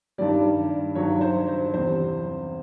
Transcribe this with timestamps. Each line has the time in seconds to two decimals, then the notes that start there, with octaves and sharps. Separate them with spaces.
0.18 G2 D#3 G3 D5
0.95 G2 D#3 F#3 C#5
1.21 C5
1.47 C5
1.74 E2 C3 E3 G3 C5